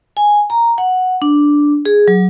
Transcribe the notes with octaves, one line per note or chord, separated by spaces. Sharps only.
G#5
A#5
F#5
D4
G#4
F#3